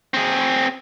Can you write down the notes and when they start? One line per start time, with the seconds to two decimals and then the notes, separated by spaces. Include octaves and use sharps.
0.14 C4 G#4